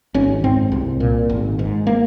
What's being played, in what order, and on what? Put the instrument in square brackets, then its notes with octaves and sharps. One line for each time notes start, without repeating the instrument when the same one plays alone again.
[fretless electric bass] G#1 C#4
G#2 C4
C2
A#2
G#1
G#2
A#3